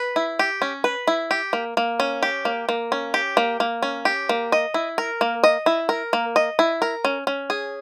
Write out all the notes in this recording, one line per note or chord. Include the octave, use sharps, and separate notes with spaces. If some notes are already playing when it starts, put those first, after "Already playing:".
Already playing: B4
E4
G4
C#4
B4
E4
G4
A#3
A#3
C#4
G4
A#3
A#3
C#4
G4
A#3
A#3
C#4
G4
A#3
D#5
E4
A#4
A#3
D#5
E4
A#4
A#3
D#5
E4
A#4
C#4
C#4
G#4